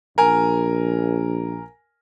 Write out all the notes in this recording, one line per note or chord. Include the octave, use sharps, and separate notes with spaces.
A#1 A#4 G#5